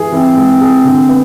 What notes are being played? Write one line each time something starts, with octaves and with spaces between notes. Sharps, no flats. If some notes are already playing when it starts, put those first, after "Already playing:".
Already playing: E3 G#4
E3 C4
G#3
G#4
D3
B3